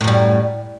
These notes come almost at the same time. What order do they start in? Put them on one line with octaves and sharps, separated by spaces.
A2 F#2 G3